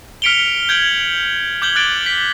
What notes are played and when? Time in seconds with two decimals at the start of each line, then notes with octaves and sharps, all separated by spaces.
0.22 F6 B6 C#7 D7 F7 G7
0.69 G6 G#6 D7 F#7
1.62 D6 G6 G#6 F#7 G7
1.76 F#6 A6 D7
2.06 B6